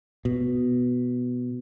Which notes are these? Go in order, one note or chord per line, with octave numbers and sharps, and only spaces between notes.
B2